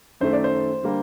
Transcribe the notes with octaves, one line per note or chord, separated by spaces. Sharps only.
F#2 D#3 A3 C5
D5
C5
D3 G3 A#3